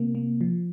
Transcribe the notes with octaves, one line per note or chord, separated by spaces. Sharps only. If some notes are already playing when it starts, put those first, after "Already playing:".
Already playing: C3 A#3
A#3
F3